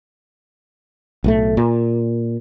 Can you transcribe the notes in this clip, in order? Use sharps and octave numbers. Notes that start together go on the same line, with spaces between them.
B1 A2 A3
A#2